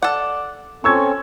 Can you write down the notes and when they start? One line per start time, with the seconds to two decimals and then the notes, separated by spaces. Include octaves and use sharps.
0.02 A4 D5 F#5
0.84 C4 C#4 A4 C#6 E6 G#6